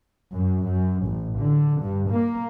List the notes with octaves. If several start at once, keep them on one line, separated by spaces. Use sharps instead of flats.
F#2
F#2
A1
D3
G2
A#3